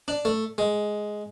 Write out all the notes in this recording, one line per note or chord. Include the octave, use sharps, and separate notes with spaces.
D4
A3
G#3